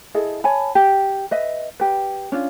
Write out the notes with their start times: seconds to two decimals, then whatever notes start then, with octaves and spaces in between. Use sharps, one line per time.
0.14 E4 G#4 A4 D#5
0.44 C#5 G#5 A5 B5
0.75 G4
1.31 B4 D#5 E5
1.80 G4 B4
2.32 C#4 D4 F4